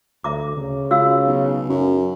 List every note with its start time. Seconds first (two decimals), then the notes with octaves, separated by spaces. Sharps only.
0.24 D2 E5 A#5 D6
0.57 C#3
0.91 C#2 F#4 F5 E6
1.26 B1
1.69 F#2 F#3